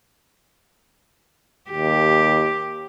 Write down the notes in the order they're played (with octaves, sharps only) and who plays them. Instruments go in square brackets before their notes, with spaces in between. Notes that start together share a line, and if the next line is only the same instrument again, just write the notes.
[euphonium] D#2 [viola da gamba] G4